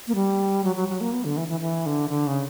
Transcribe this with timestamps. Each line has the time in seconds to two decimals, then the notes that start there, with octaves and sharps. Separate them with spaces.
0.08 A#3
0.15 G3
0.64 F#3
0.76 F#3
0.89 F#3
1.01 A#3
1.12 B3
1.25 D3
1.37 E3
1.48 E3
1.61 E3
1.86 D3
2.10 D3
2.27 C#3